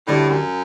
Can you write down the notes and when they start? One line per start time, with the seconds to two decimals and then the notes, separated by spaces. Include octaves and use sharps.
0.07 D2 A2 D3 G3 D4
0.29 F#2